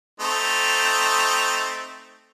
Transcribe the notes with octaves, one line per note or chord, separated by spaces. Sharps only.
A3 C4 D#4